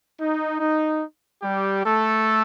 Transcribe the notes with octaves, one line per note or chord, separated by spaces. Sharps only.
D#4
D#4
G3 G4
A3 A4